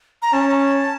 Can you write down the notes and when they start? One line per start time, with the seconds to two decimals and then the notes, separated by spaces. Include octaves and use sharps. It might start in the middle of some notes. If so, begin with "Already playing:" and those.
0.22 A#5
0.33 C#4 A5